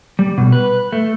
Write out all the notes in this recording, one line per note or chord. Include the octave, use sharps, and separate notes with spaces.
G3
B2
B4
A3